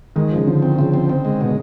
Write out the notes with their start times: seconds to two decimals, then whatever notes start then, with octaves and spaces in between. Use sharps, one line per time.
0.16 D#3 G#3
0.31 C#3 F3
0.47 D3 F3
0.62 C4
0.79 C#3 F3
0.94 C4
1.09 C4
1.25 G#3
1.41 B2